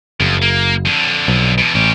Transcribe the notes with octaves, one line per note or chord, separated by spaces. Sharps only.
F#1 F2
A#3
F2 D3
B1
E2 B2
A1 C#4 G4